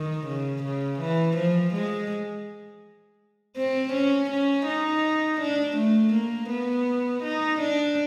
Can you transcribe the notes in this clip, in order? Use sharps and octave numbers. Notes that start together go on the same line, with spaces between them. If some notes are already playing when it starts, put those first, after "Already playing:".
Already playing: D#3
C#3
C#3
E3
F3
G#3
C4
C#4
C#4
D#4
D4
A3
A#3
B3
D#4
D4